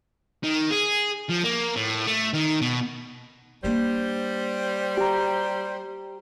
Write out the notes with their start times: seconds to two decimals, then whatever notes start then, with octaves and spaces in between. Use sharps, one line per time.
0.44 D#3
0.71 G#4
1.30 F3
1.44 A#3
1.76 A2
2.07 A3
2.34 D#3
2.61 B2
3.64 G3 A#3 D4 C5
4.97 G4 A#5